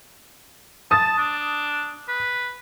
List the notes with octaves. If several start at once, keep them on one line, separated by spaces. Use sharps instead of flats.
A5 D#6 A6
D4
B4